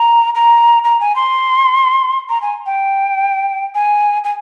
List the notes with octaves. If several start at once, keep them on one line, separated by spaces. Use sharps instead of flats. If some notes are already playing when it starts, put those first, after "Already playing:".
Already playing: A#5
A#5
A#5
G#5
C6
A#5
G#5
G5
G#5
G#5